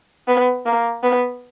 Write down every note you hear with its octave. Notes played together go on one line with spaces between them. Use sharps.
B3
A#3
B3